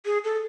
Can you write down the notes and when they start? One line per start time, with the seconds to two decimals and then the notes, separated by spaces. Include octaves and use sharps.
0.05 G#4
0.24 A4